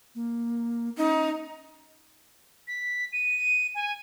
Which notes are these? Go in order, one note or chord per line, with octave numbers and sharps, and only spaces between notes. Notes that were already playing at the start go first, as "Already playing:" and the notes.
A#3
C#4 D#4
B6
D#7
G#5